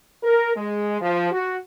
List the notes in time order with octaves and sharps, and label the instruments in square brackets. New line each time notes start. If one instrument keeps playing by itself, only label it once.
[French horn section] A#4
G#3
F3
F#4